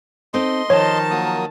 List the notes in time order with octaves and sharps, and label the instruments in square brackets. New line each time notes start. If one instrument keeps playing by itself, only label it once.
[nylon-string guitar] C4 D#4 A4 [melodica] D#5 C6
[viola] D#3 A5 [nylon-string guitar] F3 [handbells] C#5
[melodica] F#3 A#3 D#6